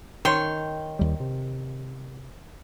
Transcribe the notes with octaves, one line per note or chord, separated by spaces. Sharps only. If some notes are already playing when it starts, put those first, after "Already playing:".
D#3 C#5 G5 C6
D#2 G3
C3